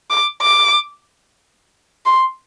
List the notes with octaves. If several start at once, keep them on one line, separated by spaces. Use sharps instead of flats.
D6
D6
C6